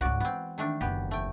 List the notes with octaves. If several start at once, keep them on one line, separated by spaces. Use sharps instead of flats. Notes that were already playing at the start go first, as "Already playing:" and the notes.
C#2 G#2 F#4 D5
E3 G#3 B3 C4
D#3 A3 D4
F#1 E2 B3 G4
A3 G5